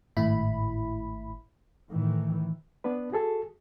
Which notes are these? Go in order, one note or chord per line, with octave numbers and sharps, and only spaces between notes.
G#1 A2 E4 B5
A2 D#3 E3
B3 D4 B4
F#4 G#4 A4